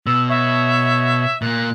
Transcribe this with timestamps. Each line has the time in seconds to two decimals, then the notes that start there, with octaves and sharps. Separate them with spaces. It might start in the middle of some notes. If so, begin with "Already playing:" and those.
0.07 B2 E6
0.29 C#5 E5
1.42 A#2 A#3 F#6